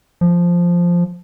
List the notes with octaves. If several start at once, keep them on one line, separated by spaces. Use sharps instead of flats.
F3